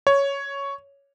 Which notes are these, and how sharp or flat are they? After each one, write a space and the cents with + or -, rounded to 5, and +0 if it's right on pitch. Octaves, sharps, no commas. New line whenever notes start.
C#5 +5